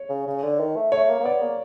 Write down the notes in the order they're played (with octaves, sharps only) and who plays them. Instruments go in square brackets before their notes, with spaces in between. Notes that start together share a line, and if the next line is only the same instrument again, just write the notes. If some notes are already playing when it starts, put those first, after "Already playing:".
Already playing: [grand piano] C#5
[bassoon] C#3
C#3
D3
D#3
A3
[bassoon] A3 [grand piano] C#5
[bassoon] A#3
A#3
[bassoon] B3 [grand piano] D5
[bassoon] A#3